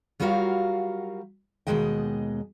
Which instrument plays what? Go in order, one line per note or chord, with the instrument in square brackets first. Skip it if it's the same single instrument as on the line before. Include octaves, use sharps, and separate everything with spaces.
[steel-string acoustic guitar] F#3 G3 F4 F#4 A#4 F5
D#2 B2 D#3 G#3 D#5 G5